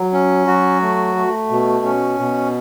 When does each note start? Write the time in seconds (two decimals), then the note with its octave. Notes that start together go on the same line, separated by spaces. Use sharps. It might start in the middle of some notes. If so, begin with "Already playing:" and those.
Already playing: F#3
0.13 C#4
0.47 F#3 F#4
0.82 A3
1.15 A3
1.50 B2
1.85 C#4
2.19 B2